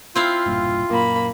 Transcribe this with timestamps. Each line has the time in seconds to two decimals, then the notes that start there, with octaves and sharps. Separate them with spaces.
0.15 C4 E4 F4 F5
0.46 E1 G2 A#2
0.90 F#2 A#2 A#3 B5